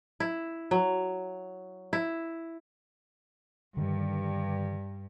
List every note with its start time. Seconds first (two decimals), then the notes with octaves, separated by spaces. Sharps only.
0.20 E4
0.71 F#3
1.93 E4
3.77 G2 D3 D#3 G3